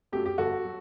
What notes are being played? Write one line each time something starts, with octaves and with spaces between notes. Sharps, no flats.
F#2 F#3 A3 G4
G4
G1 F#4 A4
F#3